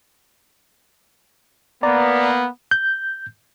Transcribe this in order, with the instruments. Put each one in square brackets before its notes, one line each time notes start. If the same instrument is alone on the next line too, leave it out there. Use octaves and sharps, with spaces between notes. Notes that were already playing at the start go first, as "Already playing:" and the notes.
[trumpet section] A#3 B3 [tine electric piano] D5 A#5
[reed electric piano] G6